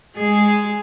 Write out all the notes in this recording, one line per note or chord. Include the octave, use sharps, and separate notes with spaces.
G#3 G#4